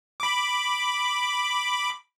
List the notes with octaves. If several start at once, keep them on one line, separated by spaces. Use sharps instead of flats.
B5 D6